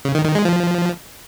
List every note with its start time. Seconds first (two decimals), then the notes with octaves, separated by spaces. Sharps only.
0.05 C#3
0.15 D#3
0.25 D#3
0.35 G#3
0.45 F3